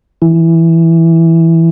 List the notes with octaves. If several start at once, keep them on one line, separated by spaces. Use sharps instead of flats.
E3